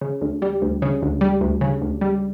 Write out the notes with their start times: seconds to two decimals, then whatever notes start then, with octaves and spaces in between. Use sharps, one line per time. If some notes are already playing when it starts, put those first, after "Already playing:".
0.01 C#3
0.21 D2
0.42 G3
0.62 D2
0.82 C#3
1.02 D2
1.21 G3
1.41 D2
1.61 C#3
1.82 D2
2.01 G3